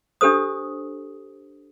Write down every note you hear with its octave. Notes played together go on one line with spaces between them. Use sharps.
D4 G4 A4 C5 D#6